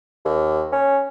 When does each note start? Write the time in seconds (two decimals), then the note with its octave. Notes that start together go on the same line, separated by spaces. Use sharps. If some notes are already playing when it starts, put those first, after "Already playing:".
0.25 D#2
0.72 C#4